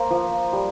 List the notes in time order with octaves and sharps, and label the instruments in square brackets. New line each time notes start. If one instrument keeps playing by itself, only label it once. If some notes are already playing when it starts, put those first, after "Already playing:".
Already playing: [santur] A#3 A#4 C5
F3
G3